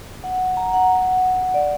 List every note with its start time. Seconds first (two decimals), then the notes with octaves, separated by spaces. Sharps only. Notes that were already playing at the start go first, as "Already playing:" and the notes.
0.24 F#5
0.57 A#5
0.73 F#5
1.54 D5